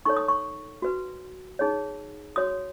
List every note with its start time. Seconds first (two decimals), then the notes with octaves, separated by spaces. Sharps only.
0.05 D#4 A4 C#5 C#6
0.17 D#6
0.28 C#6
0.82 F#4 B4
1.59 D#4 G#4 C#5
2.36 F#4 C#5 D#6